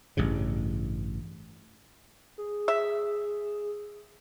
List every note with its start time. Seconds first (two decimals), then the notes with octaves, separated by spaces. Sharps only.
0.17 A1 G2 C#3
2.38 G#4
2.68 E5